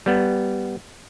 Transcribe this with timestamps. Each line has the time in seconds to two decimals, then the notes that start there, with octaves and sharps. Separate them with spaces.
0.06 G3 B3